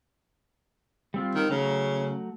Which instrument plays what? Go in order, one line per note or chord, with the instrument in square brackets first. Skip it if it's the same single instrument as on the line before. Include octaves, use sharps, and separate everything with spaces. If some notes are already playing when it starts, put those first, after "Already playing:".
[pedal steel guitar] G3 C4 F4
[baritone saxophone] D#3
[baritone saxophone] C#3 [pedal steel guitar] F#3 A3 A#5